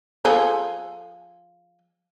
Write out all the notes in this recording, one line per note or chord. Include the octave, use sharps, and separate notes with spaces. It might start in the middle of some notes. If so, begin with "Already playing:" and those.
F3 G#4 A4